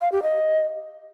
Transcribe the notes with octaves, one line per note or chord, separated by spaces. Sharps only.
F5
G4
D#5